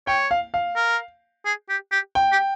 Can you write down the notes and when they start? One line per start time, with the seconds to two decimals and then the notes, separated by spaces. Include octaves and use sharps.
0.07 C#5 G5
0.31 F5
0.54 F5
0.76 A#4
1.46 G#4
1.69 G4
1.92 G4
2.15 G5
2.32 G4